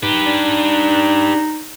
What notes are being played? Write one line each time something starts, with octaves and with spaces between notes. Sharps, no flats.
D#4 G4 B4
D4